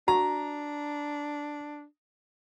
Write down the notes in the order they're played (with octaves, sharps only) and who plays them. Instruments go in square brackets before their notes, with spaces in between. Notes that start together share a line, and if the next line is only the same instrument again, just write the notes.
[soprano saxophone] D4 [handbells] F#4 [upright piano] A#5